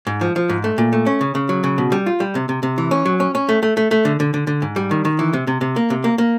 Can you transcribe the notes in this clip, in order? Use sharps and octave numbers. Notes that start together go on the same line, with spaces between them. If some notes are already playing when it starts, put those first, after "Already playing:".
G#2
F3
F3
G#2
A3
A#2
A3
C#4
C#3
C#3
F#3
C#3
B2
G3
F4
G3
C3
C3
C3
E3
C#4
F#3
C#4
C#4
A3
A3
A3
A3
D3
D3
D3
D3
G#2
G3
D#3
D#3
E3
C3
C3
C3
A#3
C3
A#3
A#3